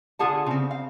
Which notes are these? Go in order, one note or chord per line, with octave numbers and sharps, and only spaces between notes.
D3 F4 G#4 F#5 A5
C#3 C4
F5